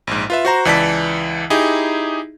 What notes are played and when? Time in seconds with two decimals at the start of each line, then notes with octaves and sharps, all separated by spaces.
0.07 A#1 G#2
0.30 F4 B4 E5
0.45 F#4 C5 A#5
0.65 C#2 E3 D5 A5 B6
1.50 D#4 E4 G4 G#4